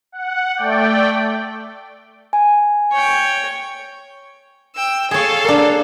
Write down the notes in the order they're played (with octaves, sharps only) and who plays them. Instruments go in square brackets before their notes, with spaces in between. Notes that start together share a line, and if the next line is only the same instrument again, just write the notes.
[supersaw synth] F#5
A3 D5 G5
[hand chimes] G#5
[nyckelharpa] C#5 G5
[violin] G5 E6
[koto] G#4 C#5 [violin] A4 F5
[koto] A#3 D4